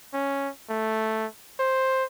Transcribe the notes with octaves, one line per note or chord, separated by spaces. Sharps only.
C#4
A3
C5